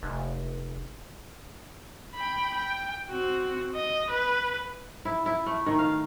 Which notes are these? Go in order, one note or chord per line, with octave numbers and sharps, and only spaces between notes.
F1
G5 B5
G5
C4 F#4
D#5
B4
E4
E4
A3
D#3
F5